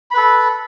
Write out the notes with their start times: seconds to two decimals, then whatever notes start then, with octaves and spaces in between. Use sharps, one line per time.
0.11 B5
0.14 B4
0.17 A4